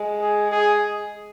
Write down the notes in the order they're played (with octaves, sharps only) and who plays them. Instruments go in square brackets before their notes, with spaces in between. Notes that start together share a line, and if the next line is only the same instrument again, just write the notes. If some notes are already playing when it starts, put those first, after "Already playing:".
Already playing: [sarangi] G#3
[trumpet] G#4
G#4